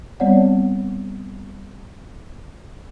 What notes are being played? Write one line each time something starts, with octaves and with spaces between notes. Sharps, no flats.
G3 B3 C4 C#5 D5 F#5